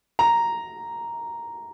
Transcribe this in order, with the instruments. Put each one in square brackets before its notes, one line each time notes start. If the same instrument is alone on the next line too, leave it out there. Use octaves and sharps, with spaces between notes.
[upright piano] A#5